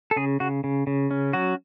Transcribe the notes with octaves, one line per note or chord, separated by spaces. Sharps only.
A4
C#3 G#4
C#3 F#4
C#3
C#3
C#4
F#3 F#4